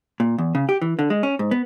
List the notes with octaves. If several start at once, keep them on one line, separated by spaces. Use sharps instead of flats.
A#2
E2
C#3
G4
E3
D3
G#3
C#4
G#2
B3